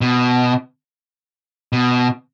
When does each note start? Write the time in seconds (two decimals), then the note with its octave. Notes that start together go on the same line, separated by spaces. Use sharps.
0.01 B2
1.73 B2